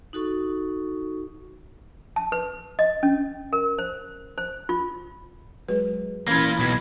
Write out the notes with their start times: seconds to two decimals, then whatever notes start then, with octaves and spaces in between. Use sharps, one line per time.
0.13 D#4 F#4 A4 C#6
2.16 A5
2.32 B4
2.79 D#5
3.03 C#4
3.53 A#4
3.79 C5
4.38 C5
4.69 F4
5.68 F#3 G#3 B4
6.28 E3 A#3 C#4 E4 F4 B5 G#6
6.59 B1 B2